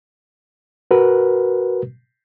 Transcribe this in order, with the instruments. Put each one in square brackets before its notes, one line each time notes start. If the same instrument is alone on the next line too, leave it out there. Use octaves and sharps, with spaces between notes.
[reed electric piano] F#4 A#4 B4